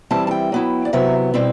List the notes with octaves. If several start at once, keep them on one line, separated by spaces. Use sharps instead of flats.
E3 G3 C4 E4 A5
A5
G5
F#3 B3 E4
D5
C3 F#3 B3 E4 E5
B2 G3 C4 E4